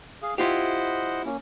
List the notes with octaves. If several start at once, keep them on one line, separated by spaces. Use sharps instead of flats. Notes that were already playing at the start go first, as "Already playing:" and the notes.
G#4 F5
E4 F4 G4 C5 D#5 F#5
A#3 C#4